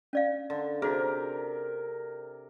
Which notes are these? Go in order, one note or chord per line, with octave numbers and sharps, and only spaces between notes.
C#4 D5 F5
D3
C3 F#4 G#4 A#4